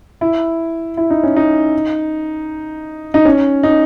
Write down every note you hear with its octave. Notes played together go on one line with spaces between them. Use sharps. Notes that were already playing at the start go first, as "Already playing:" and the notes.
E4
E4
D#4
C#4
D#4
D#4
C#4
D#4